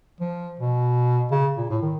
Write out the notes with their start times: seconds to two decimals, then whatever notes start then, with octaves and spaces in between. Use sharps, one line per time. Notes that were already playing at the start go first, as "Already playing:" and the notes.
0.20 F3
0.59 B2
1.31 C#3
1.57 A#2
1.70 A2
1.82 D#3